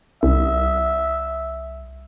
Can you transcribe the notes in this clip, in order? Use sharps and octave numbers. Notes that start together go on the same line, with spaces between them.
C2 E5